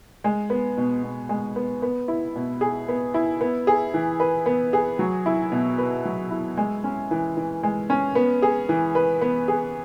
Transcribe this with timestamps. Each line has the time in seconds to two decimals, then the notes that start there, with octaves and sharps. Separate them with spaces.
0.24 G#3
0.50 B3
0.77 B2
1.03 B2
1.29 G#3
1.56 B3
1.82 B3
2.08 E4
2.35 B2
2.61 G#4
2.88 B3
3.14 E4
3.41 B3
3.67 G#4
3.94 E3
4.20 B4
4.46 B3
4.73 G#4
4.99 F#3
5.26 E4
5.52 B2
5.78 B4
6.05 F#3
6.31 E4
6.57 G#3
6.84 C#4
7.11 E3
7.37 E3
7.63 G#3
7.90 C#4
8.15 B3
8.42 G#4
8.69 E3
8.95 B4
9.21 B3
9.48 G#4